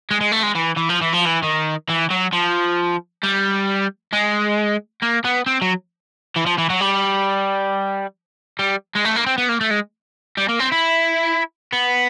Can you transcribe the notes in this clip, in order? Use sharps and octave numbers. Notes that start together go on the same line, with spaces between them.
G#3
G#3
A3
G#3
E3
E3
F3
E3
F3
E3
D#3
E3
F#3
F3
G3
G#3
A#3
B3
C4
F#3
E3
F3
E3
F#3
G3
G3
G#3
A3
A#3
C4
B3
A#3
A3
G#3
G3
A#3
C4
E4
B3